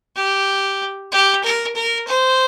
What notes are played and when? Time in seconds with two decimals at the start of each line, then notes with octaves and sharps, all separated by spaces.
0.16 G4
1.12 G4
1.44 A#4
1.75 A#4
2.07 C5